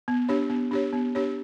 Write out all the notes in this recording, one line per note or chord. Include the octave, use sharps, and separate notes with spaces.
B3
D4 G4 C#5
B3
D4 G4 C#5
B3
D4 G4 C#5